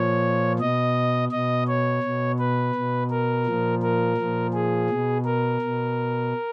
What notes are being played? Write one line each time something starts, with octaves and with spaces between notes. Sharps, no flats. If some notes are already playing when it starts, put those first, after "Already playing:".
Already playing: A#2 F3 C#5
B2 D#5
B2 D#5
C#5
B2
B4
B2
A#4
A#2 F3
A#4
A#2 F3
G#4
B2
A#4
B2